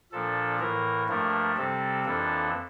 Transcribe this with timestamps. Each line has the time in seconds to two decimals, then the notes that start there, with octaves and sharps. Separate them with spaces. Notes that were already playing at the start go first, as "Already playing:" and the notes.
0.12 A#2 F3 A#3 D4 A4
0.60 A2 E3 A#3 A#4
1.08 G2 F3 A3 A#3 D4 A#4
1.57 C3 G3 C4 A4
2.05 F2 E3 A#3 D4 A4